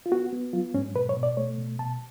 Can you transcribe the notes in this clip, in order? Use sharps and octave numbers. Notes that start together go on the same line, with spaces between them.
F4
B3 F#4
B3
F#3 F4
G#2 C#4
B2 B4
C#5
B2
D5
A3 C#5
B2
B2 A5